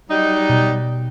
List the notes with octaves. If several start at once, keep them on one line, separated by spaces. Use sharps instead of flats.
F#3 G3 D#4
B2